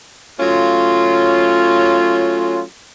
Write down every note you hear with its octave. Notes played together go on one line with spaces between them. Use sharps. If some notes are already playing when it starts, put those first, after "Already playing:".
F#3 A3 C#4 F4